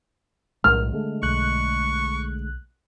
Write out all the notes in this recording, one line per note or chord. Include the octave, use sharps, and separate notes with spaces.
B1 A2 G#3 F6
D3 G#3 A3
B1 C#6 F#6